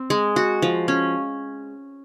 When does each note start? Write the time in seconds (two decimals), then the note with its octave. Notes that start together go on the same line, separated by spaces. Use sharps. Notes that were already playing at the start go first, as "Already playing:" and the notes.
Already playing: C4
0.10 G#3
0.36 F#4
0.62 F3
0.88 C#4